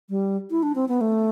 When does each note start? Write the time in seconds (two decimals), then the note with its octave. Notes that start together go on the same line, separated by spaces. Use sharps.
0.10 G3
0.51 E4
0.63 D4
0.75 C4
0.88 B3
1.01 A3